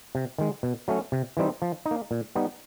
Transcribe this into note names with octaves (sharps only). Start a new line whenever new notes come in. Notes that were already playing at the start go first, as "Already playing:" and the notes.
C3
D#3 G#3
B2
F#3 A3 C#4
C3
E3 G3 C4 D#4
F3
D#4
A#3
A#2
G3 B3 D#4